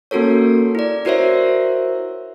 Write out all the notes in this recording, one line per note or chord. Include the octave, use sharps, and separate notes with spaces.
A#3 C#4 F#4 A4 A#4 C#5
E4 D5
E4 F#4 A#4 C5 C#5 E5